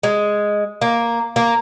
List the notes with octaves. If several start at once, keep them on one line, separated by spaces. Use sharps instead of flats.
G#3
A#3
A#3